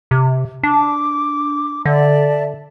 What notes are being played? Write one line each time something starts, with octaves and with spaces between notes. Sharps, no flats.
C3
D4 D6
D3 D5 E5 A5